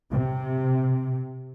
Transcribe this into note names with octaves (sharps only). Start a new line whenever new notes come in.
C3